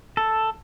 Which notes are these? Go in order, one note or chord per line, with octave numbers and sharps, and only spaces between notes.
A4